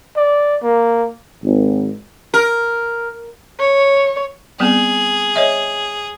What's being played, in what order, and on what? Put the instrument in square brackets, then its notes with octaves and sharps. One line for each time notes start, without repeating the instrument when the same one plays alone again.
[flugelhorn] D5
A#3
[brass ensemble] G#1
[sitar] A#4
[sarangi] C#5
[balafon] G3 B3 C4 [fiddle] G#4
[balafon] C#5 D#5 E5